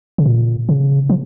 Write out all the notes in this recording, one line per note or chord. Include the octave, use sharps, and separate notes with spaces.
C#3
A#2
C#3
F3